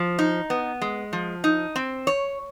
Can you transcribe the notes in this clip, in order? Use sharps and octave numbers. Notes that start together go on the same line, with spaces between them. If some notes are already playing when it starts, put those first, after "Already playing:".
Already playing: F3
D#4
B3
G#3
F3
D#4
C4
C#5